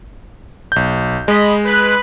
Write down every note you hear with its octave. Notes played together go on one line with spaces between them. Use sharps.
B1 G6
G#3 D#5 B5
B4